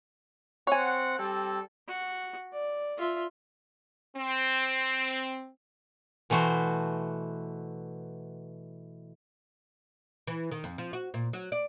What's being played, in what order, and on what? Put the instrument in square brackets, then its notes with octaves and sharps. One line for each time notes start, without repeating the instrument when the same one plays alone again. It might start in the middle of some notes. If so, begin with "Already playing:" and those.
[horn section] C4 F#5 [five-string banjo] C#5 G#5
[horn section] G3 C4 A4
[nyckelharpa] F#4
D5
F4 E5
[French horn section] C4
[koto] B2 E3 A3 F#4 C5
[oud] E3
D#3
F2
F3
F#4
A#2
F#3
D5